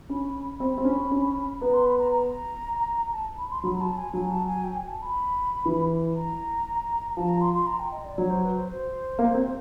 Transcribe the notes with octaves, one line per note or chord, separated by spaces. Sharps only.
C#4 B5
C4 B5
C4
C#4
C#4
B3 A#5
C6
B5
A#5
A#5
A5
B5
C6
F#3 B5
A5
G#5
F#3 G#5
A5
G#5
G5
G#5
A5
B5
E3
A#5
F3 A5
A#5
C6
C6
A#5
G5
D#5
D5
F#3 C#5
C5
B4
C5
C5
A#3
C4